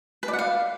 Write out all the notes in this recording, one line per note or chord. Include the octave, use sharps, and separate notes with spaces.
B4
D5
F#5
F5